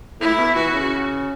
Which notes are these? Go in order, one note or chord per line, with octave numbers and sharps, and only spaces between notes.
A2 E4
B2
E3 F#4
C#3